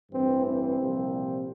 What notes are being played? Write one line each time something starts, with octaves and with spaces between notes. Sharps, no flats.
A1 G2 E3 C4
C4
C2 A#2 F3